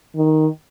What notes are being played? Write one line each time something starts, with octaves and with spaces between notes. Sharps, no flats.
D#3